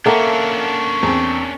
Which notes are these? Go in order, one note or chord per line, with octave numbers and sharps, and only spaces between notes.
A#3 C#4 D4 A4 E5 F#5
E2 C4